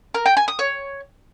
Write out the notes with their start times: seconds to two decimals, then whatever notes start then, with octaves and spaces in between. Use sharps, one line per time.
0.14 A#4
0.26 G5
0.37 G#5
0.48 D#6
0.59 C#5